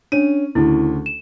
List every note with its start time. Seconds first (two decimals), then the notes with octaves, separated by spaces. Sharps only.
0.12 C#4 D4 D#7
0.55 D2 C#3 E4
1.06 E7